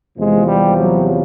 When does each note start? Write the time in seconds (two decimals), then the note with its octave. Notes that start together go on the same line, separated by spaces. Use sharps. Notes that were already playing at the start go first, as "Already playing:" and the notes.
0.17 E2 C3 F3 G#3
0.46 G3
0.75 F#3